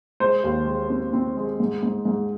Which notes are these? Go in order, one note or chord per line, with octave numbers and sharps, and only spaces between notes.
G#3 C5
D#2
G#3
C4
C4
G#3
G#2
G#2
G#2